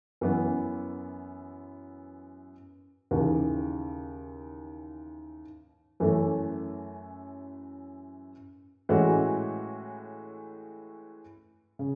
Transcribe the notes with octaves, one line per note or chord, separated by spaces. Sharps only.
F#2 E3 B3
D#2 C#3 E3
F#2 E3 A3 C#4
A2 E3 G#3 C#4 F#4
C#3